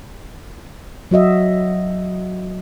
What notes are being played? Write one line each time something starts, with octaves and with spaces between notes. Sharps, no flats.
F#3 F#4 D#5 E5